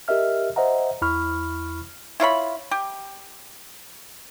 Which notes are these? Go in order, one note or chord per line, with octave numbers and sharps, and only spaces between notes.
G4 A#4 D#5 E5 F6
C5 D#5 E5 F#5 A#5
E2 E4 B5 C#6 F6
E4 F4 C#5 B5
G4